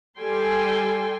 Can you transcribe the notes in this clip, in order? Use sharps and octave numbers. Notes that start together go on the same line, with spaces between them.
G3 A4 G5 G#5 C6